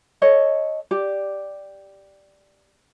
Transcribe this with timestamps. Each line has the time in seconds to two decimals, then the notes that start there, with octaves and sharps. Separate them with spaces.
0.22 A4 C#5 D#5
0.91 G4 D5